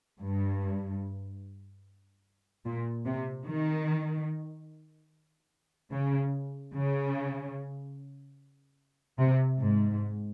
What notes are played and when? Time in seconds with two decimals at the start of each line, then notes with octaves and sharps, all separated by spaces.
0.20 G2
2.65 A#2
3.05 C3
3.46 D#3
5.92 C#3
6.74 C#3
9.18 C3
9.59 G#2